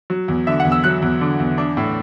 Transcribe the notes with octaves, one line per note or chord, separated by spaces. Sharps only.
F#3
E2
D3 E5
F#5
E2
E6
F#3 F#6
E2
D3
E2
D4
A2